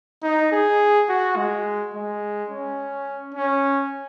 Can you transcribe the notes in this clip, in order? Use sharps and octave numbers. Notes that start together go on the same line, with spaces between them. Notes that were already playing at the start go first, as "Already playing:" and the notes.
D#4
G#4
F#4
G#3
G#3
C#4
C#4